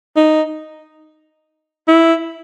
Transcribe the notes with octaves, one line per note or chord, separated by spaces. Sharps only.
D#4
E4